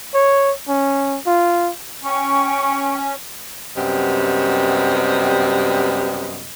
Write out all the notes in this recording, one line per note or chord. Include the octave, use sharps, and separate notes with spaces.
C#5
C#4
F4
C#4 G5 C#6
F#2 C3 G3 B3 D#5